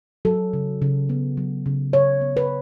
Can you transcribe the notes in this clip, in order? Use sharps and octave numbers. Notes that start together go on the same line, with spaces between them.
F#3 A4
C#3
C#3
B3
F#3
C#3
C#3 C#5
B3
B4